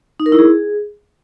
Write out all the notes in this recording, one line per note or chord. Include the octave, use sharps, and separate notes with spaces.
D#4
A#4
E4
G#4